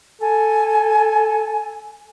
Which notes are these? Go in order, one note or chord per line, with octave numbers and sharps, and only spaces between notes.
A4 G#5